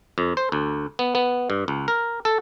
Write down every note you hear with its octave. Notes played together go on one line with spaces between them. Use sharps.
F2
C5
D2
B3
B3
G2
C#2
A#4
A4